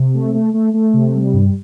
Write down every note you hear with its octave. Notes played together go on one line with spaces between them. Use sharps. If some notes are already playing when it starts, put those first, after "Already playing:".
Already playing: C3
A3
A3
A3
A3
C3
G3
G2